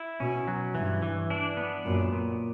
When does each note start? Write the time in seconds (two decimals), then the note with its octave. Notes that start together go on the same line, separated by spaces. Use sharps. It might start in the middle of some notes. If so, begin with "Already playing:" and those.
Already playing: E4
0.20 B2 C#4
0.48 F#3
0.75 G2 E3
1.02 E3
1.30 D4
1.57 B3
1.85 F#2 A#2
2.13 A#2